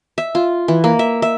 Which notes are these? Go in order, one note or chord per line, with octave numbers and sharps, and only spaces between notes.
E5
F4
E3
A#3
E5
E5